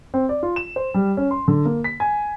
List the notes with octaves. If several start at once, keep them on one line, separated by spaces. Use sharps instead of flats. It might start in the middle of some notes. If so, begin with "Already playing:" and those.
C4
D5
F4
E7
C5
G3
C#4
C6
D3
A#3
B6
G#5